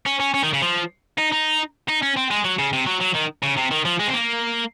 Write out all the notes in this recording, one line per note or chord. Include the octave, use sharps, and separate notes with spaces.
C#4
C#4
C#4
D#3
C#3
F3
D#4
D#4
D#4
C#4
C4
G#3
F#3
C#3
C3
F#3
F#3
D#3
C#3
C3
D#3
F3
G#3
C4
A#3